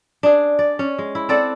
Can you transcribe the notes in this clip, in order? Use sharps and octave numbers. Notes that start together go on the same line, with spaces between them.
D4 G#4
D5
C#4
G#3
E4
C4 A4 D5 F#5